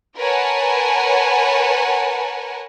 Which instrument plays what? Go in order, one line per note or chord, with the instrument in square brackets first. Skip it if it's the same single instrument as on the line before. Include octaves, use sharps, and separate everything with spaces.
[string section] A#4 B4 C#5 F#5 G#5 A5